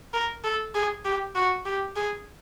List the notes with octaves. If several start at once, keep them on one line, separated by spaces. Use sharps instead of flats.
A#4
A4
G#4
G4
F#4
G4
G#4